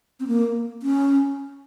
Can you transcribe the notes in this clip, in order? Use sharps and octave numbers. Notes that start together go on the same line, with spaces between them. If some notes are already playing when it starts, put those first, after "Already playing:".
C4
A#3
C#4